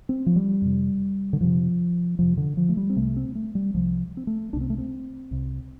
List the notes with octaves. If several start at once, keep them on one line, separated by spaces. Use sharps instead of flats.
C4
F3
G3
F2 C3
D3
F2 C3 F3
F2 C3 F3
D3
F3
A3
G3
C4
C2 C3 A3
C4
A3
G3
C2 C3 F3
C4
A3
C2 C3 D4
C4
A3
C4
C2 C3